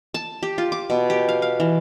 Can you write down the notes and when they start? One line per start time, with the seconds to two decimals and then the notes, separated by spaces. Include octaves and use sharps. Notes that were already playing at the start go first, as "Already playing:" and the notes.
0.14 A5
0.43 G4
0.58 F4
0.72 D6
0.90 B2
1.10 G4
1.29 F5
1.42 F5
1.60 E3